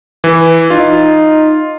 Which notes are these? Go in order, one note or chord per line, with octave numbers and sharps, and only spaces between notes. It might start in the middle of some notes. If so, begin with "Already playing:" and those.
E3
D#4 F4